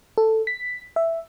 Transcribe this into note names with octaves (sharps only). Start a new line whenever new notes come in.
A4
B6
E5